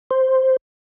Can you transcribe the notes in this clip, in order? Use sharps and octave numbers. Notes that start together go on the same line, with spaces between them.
C5